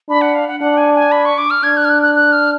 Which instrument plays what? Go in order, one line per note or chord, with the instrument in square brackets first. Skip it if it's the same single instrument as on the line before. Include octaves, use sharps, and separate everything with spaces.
[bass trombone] D4 [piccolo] B5
[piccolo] F#5
F5
F#5
[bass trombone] D4 [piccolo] F#5
[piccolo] G#5
G#5
B5
C#6
D6
F6
[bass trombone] D4 [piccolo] G#6
[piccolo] F#6
F6
F#6
F#6
F#6
F6